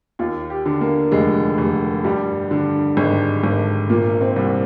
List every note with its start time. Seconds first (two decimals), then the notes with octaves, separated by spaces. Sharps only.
0.19 D#2 F4
0.50 G4
0.66 D3
0.81 A#3
1.12 F1 G#3
1.58 F1
2.04 G2 G3
2.51 D3
2.97 G#1 G#3
3.44 G#1
3.90 A#2 A#3
4.21 C4
4.36 C2